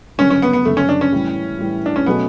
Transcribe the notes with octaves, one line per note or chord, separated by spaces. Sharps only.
F#1 F#2 D3 G3 C#4
C#4
B3
B3
F#1 F#2 D3 G3 A3
C#4
D4
C#4
A2 E3 G3
A2 E3 G3
D4
C#4
B2 F#3 A3 B3 C#4